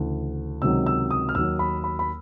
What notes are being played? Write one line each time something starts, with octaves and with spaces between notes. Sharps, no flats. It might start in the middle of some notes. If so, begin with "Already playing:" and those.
Already playing: D2 C#3 E3
C#2 C3 D#3 F#3 E6
E6
D#6
F6
D#2 D#3 F#3 E6
B5
B5
B5